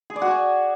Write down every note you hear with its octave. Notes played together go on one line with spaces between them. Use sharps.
G#4
D5
F#4
G#5